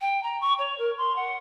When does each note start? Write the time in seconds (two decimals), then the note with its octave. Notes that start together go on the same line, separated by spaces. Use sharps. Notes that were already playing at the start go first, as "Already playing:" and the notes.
0.01 G5
0.23 A#5
0.41 C#6
0.59 C#5
0.78 A#4
0.98 C6
1.16 F#5